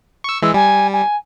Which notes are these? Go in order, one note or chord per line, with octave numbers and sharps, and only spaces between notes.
C#6 E6
E3 G#3 E6
G3 G#5
G#5